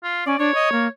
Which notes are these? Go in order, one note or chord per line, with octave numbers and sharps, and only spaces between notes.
F4
C#4 D5
D4 C#5
D#5
A#3